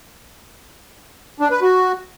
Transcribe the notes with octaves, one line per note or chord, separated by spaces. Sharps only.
D4
B4
F#4